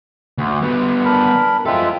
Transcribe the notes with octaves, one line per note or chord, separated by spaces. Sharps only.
D2
G3 B3
D4 A#4 B5
G#3 C4 F4 A4 E5